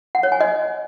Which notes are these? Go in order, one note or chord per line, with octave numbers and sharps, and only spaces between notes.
F#5
C#5
G#5
D#5